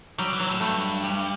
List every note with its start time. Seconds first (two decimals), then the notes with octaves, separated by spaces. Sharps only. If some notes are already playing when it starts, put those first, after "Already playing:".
0.18 F#3 G3
0.33 E3
0.40 F#3
0.47 A2
0.60 G2 A3
1.04 G3